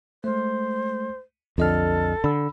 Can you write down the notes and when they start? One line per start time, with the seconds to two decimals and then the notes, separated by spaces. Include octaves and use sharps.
0.24 G#3 A3 C5
1.58 B1 F2 D3 A4 D#5 F6
2.24 D3 B5 E6